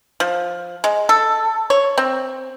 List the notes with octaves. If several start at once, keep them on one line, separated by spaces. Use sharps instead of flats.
F3
G#3
A4
C#5
C4